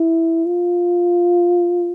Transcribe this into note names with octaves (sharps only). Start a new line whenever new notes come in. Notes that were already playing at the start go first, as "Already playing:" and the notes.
Already playing: E4
F4